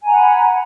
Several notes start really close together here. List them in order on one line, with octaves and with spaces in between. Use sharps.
G#5 A#5 F#5 B5